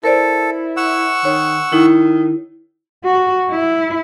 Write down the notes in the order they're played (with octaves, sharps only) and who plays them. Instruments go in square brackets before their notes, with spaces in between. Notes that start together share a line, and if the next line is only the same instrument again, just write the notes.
[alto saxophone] E4 [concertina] A4 [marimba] A#4 C5 D5
[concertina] F#5 C#6 E6
[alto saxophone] D#3 [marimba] C#5
[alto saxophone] D#3 [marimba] E4
[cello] F#4
E4